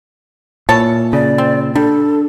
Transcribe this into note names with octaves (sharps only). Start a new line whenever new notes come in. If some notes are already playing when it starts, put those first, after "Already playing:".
A#2 E3 C#5 A5
C#3 D5
C4
G3 D4 A4